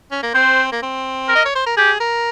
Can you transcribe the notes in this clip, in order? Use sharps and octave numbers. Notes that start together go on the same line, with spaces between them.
C#4
A#3
C4 C5
A#3
C4
A#4
D#5
C#5
C5
A#4
G4 G#4
A#4